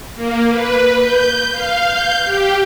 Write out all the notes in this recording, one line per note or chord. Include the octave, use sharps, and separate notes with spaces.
A#3
B4
G6
F5
G6
G4